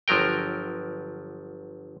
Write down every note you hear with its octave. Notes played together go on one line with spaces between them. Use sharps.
G1 F3 F#3 A#4 G5